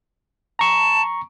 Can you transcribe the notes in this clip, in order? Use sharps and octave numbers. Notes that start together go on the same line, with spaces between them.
A5 A#5 C#6